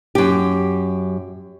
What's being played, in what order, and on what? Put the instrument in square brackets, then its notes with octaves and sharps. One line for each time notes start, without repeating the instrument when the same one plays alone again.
[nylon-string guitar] F#2 G4